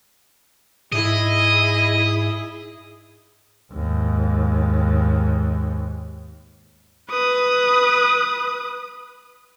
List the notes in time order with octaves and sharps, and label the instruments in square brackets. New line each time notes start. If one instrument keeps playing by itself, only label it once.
[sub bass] G#2 [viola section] E4 G#4 [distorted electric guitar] D#5
[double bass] D#2 G#2
[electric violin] B4 D#6